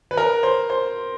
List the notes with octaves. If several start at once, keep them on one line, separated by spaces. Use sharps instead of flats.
B4
A#4
C5
C5